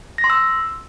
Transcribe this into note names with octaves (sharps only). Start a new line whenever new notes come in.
A#6
C6
E6